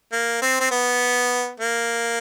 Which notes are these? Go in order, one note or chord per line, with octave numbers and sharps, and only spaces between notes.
A#3
C4
C4
B3
A#3